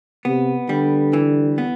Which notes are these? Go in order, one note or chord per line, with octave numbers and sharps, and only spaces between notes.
C3 B3
D3 G3
E3
B3